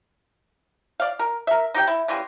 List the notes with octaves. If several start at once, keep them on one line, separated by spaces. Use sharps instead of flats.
D5 F5
A#4
A#4 E5
D#4 G4 G5
E4
C#3 E3 G3 G#3